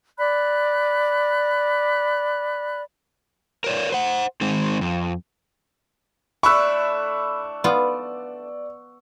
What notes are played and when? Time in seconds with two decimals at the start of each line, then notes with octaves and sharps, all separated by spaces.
0.17 D5 B5 F#6
3.64 A#4 C#5 D5
3.92 C5 F#5
4.41 D#3 G#3 C4
4.81 F2
6.43 A3 D4 E4 B5 C#6 E6 F#6
7.64 B3 F4 D5